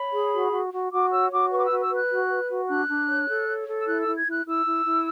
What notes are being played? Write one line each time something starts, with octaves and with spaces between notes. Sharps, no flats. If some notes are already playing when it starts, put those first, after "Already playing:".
Already playing: C#5 B5
G#4
F#4
F#4
F#4
F#4 D6
C#5 E6
F#4 D6
B4 C#6
D6
E6
F#4
E6
B4
F#6
F#4
B4
F#4
D4 F#6
D4
C#5
A4
C#5
A4
E6
E4 F#6
E6
E4
G#6
E4 F#6
E4 E6
E4
E4